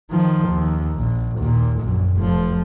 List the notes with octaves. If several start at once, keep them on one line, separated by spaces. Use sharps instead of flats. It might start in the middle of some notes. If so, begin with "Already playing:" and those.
D#3 F3
D#2
A#1
D#2 A#2
A#1 F#2
F1 F3